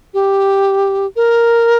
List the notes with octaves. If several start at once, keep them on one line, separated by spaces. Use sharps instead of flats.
G4
A#4